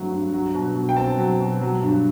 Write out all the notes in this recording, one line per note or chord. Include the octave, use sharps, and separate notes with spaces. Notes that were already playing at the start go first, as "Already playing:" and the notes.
Already playing: G2 F#3 A3 C4
G2
F#3
B2
B2
G5
C4 A5
F#3
B2
F#3
G2